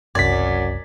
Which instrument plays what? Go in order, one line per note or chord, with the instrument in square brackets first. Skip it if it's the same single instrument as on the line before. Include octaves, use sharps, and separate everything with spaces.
[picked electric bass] F#1 C2 [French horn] F#2 [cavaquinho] D5 [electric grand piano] G#6 B6